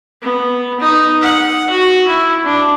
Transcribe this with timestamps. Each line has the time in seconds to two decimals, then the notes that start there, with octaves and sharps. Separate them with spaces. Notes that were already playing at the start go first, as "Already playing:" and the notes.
0.22 B3
0.81 D#4
1.22 F#5
1.70 F#4
2.08 E4
2.44 D4